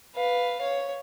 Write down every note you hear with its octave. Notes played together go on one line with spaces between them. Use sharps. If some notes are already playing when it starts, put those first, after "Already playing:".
B4 F5
C#5